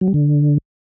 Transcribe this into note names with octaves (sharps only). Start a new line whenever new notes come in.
F#3
G3
D3